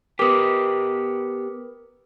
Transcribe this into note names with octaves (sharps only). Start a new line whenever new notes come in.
B3 G4 A#4 B4 D6 D#6